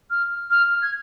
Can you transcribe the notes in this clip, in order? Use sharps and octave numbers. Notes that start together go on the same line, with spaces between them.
F6
F6
G#6